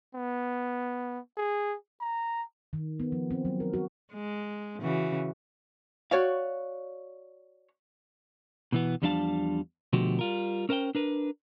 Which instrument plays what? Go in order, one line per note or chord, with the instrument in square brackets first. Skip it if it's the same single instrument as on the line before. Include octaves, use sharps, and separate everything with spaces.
[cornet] B3
G#4
A#5
[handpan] D#3
B3
F3
C4
F#3
A#4
F#4
[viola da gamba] G#3
C#3 E3 F#4
[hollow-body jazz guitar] F#4 C#5 D5 F5
[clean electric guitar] B2 E3 B3
E2 F3 G3 D4 F5 A5
B2 D3 F3 A3 F#4 G4
G3 F4 A#4
C#4 A#4 C5 F5 G5
D4 A#4 B4